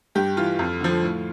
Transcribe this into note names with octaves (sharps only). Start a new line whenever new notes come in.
G2 G4
E3 F4
F2
D3 F3
A2